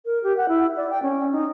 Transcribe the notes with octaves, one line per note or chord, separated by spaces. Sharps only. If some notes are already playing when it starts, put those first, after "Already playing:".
A#4
G4
F#5
E4
D5
G5
C#4
D#4